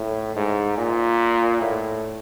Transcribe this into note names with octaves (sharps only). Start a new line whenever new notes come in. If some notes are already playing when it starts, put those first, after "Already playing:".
Already playing: A2
G#2
A#2
A2